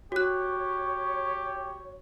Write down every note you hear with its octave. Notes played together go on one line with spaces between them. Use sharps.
F#4 G4 C#5 F#6